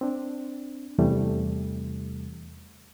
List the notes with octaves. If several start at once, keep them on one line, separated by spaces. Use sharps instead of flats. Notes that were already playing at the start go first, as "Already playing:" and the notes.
C4 D4
E2 C3 E3 G3 A3